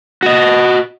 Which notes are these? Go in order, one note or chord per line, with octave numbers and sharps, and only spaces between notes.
F#4 D#5